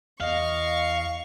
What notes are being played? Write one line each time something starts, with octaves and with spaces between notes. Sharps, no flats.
E2 D#5 F5 C#6